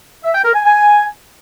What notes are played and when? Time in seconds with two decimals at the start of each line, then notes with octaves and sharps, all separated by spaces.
0.24 E5
0.35 G5
0.45 A#4
0.55 G#5
0.65 G#5